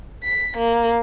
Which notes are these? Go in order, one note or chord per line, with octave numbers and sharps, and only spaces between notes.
B6
A#3